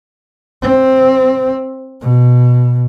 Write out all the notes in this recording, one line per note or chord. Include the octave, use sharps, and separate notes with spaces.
C4
B2